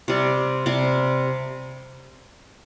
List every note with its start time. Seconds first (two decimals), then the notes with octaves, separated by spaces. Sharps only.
0.08 C3 G3
0.66 C3 G3